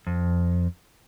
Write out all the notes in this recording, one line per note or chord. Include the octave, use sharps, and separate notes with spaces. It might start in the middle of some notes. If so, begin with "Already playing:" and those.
F2